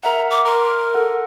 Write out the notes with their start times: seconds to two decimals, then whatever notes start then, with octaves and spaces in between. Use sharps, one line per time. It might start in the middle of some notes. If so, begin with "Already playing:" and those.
0.03 A#4 E5 F#5 A#5
0.31 D6
0.45 A#4 A#5 C6
0.95 A4 F#5